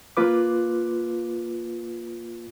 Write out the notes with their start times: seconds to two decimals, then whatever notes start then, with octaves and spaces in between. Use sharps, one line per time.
0.17 A#3 F4 B4 D6